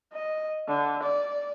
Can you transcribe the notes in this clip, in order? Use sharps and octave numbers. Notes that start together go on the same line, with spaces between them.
D#5
D3
D5